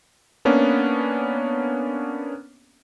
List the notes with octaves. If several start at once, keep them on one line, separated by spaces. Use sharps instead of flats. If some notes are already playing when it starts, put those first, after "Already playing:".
A#3 B3 C#4 D4